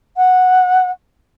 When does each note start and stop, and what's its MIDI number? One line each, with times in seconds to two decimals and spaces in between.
0.17 0.91 78